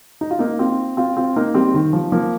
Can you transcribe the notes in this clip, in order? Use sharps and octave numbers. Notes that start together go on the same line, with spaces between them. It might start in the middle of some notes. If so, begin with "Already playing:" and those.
D#4
F4
A#3 D#4
C4 F4
C4 F4
C4 F4
A#3 D#4
G3 C4
D#3
F3
F3 A#3